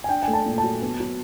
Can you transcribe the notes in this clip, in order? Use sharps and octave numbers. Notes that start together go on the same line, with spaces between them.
G#5
D4 G5
A3 G#5
A5
A#2
A5
F#3
B3
F#3